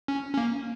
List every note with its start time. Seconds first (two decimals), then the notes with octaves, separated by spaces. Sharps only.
0.08 C#4
0.33 C#4
0.37 A#3